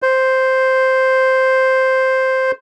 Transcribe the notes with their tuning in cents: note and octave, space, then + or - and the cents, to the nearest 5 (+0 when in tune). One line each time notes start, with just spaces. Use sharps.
C5 +0